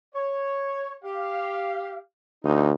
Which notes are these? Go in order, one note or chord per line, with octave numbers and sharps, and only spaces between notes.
C#5
G4 F5
D2 D#4